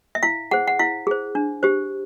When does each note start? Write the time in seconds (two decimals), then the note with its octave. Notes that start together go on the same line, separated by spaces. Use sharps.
0.15 E5
0.23 E4 F5
0.51 G#4 C5 F#5
0.68 F#5
0.79 E4 F5
1.07 G#4 C5
1.35 D4
1.63 G4 C5